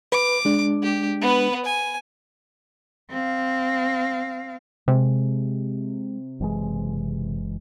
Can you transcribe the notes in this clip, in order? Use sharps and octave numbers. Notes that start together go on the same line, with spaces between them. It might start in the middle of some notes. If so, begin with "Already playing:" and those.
B4 D6
G#3 D4
G4
B3 B4
G#5
C4 F5
C3 G#3
F#1 E3 G#3